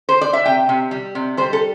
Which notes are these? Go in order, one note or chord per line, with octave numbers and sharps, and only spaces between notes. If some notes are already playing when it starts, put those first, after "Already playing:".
C5
D5
E5
C3 G5
C3
G3
C3
G3 C5
A4